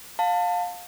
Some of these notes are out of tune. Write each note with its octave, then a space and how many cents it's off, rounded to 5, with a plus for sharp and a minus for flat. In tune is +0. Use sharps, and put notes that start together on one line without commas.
F5 +20 A5 +25